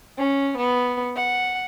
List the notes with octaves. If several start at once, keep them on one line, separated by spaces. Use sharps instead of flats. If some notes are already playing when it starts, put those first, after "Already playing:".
C#4
B3
F#5